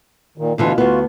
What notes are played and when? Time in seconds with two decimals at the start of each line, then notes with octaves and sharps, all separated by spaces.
0.38 A#2 D#3
0.58 D2 B2 D3 E3 F4
0.78 D2 B3 F4 F#4